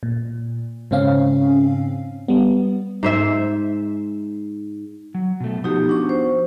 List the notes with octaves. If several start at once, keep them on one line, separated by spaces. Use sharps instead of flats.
A#2
G#2 C#3 C4 C#4 F5
G3 B3
G#2 C5 E5
F#3
B2 A3
F3 B3 D#4 F#4 G4
D4 C#6
C5